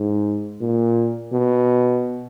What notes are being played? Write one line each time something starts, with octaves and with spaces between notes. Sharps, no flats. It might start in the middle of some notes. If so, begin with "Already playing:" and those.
Already playing: G#2
A#2
B2